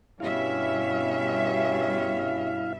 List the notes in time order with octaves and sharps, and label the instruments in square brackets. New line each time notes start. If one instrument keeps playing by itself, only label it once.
[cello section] G2 B2 E5 [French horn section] C#4 G4 [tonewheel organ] E4 F5